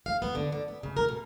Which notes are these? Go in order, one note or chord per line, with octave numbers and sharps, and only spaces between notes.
F5
B3
D3
D3
B3
C#3
A#4
B2